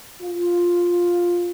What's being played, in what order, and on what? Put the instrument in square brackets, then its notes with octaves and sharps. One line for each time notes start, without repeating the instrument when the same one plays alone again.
[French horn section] F4